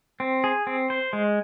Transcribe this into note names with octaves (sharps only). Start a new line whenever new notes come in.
C4
G#4
C4
C5
G#3